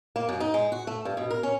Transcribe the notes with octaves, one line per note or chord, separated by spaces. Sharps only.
A#3
F#2
D#4
G#3
F#4
A3
G2
B2
A#4
C#4